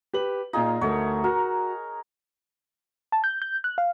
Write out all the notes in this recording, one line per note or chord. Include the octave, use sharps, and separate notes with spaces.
G4 B4 F#7
A#2 D#4 F4 G#4
D2 A3 A#4 C#5
F#4 A#4
A5
G6
G6
F#6
F5